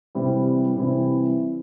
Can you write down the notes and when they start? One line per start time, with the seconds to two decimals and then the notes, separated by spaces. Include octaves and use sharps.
0.15 C3 E3 G3 C4 E4
0.76 C3 E3 G3 C4 E4